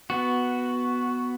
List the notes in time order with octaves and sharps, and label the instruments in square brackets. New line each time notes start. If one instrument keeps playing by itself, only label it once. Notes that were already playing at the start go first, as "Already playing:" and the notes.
[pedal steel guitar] B3 F#4